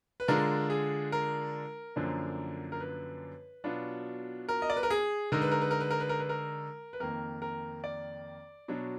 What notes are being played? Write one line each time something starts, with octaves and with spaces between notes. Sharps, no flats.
B4
D3 G#3 D4 F4 A#4
G#4
A#4
F#2 D3 F3 A#3 D4
A#4
B4
B2 F#3 B3 D4 F4
A#4
D#5
D5
B4
A#4
G#4
D3 G#3 D#4 A#4
B4
A#4
B4
A#4
B4
A#4
B4
A#4
B4
A#4
B4
F2 D#3 A#3 A#4
A#4
D5
B2 F#3 D4